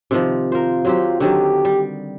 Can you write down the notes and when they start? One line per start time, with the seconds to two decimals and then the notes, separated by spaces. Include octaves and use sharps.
0.11 C3 D#3 F3
0.52 F4 A#4 C5
0.85 F#3 C4 G4
1.20 D3 D#3 F#3 G4
1.65 G3